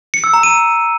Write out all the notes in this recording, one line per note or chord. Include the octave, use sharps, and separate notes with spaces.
C#7
E6
A#5
D#7